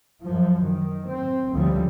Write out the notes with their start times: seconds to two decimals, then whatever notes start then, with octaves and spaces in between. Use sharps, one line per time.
0.23 F#2 F3
0.66 D#3
1.10 C4
1.54 D2 C#3 F3 G3